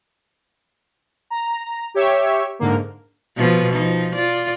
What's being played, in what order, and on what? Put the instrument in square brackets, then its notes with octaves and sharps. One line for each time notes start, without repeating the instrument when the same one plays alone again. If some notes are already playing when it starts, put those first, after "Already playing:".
[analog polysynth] A#5
G4 C#5 E5
G#2 D3 A#3
[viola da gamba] B2 F3 B3
F3 D#4
F4 D5